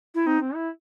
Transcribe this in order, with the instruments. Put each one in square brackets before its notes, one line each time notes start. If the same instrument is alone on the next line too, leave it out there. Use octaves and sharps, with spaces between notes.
[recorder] E4
[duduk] C4 [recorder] D#4
[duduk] C4
E4